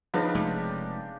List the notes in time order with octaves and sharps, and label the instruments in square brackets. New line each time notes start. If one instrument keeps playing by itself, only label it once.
[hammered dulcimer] C#3 D4 G4 [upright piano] F3 B3 D#4
[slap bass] F1 G#3 A3